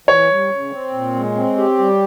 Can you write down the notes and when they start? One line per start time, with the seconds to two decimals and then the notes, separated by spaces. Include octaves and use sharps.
0.07 E3 C#5
0.29 G3
0.50 C#3
0.71 C4
0.93 A#2
1.14 G#3
1.35 C4
1.57 G4
1.78 G3